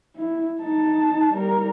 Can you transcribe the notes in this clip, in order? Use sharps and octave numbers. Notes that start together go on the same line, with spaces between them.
E4
D#4 A5
G3 A#4